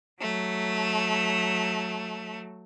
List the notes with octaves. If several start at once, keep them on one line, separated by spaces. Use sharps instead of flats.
F#3 A3